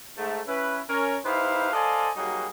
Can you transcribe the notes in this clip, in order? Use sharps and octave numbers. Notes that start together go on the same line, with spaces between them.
G#2 A3
C#4 E4 B4
C#4 A#4
D#4 E4 G4 B4 C5 F5
A4 C5 D5 D#5 F5 G#5
F#3 G3 A#3 D#4 F#4 G#4